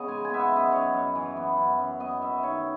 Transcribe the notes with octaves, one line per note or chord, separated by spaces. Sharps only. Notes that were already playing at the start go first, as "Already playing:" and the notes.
Already playing: C#3 B3 C#5 D#5
G#3 G#5
G#5
B3 E5
F#5
F#2 D#5
F#2 C#5
F#2
E3
B3
F#2
F#2
B3 D#5
F#2 E5
D#3 C#5